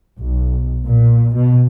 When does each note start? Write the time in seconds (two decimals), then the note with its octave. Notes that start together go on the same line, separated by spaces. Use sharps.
0.18 B1
0.86 A#2
1.36 B2